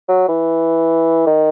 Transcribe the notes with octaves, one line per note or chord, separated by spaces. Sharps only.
F#3
E3
D#3